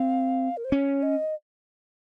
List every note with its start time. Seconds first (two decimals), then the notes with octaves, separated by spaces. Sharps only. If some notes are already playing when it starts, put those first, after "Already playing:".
Already playing: C4 F5
0.57 A#4
0.65 C5
0.72 C#4 C#5
1.03 D#5